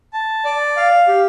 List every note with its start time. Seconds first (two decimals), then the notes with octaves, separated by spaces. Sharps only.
0.13 A5
0.45 D5
0.77 F5
1.08 G4